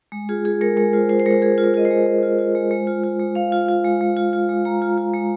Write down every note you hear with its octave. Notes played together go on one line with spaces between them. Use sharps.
G#3
F4 G#4
F4 G#4
G#3 A#4
G#3 A#4
F4 C5
F4 C5
C5
G#3 A#4
G#3 G#4
F4
A#4
F4 D#5
C5
G#3
G#3
F4
F4
G#3
G#3
F4
F4
G#3
G#3 F5
F4
F4
G#3
G#3
F4
F4
G#3
G#3 A#5
F4
F4
G#3